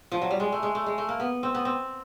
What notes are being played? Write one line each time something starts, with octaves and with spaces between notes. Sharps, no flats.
F3
F#3
G3
G#3
A3
G#3
A3
G#3
A3
A#3
B3
C4
B3
C4